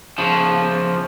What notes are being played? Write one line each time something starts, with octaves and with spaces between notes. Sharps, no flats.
C#3 F3